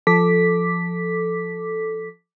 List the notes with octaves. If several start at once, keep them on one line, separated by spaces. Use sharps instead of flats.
F3 A4 D6 B6